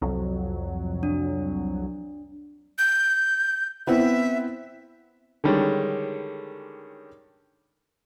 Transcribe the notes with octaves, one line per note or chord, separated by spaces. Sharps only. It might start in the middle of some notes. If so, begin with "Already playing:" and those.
C2 F2 F#3
D4
G6
B3 C4 E4 E5
D3 D#3 G3 G#3 C#4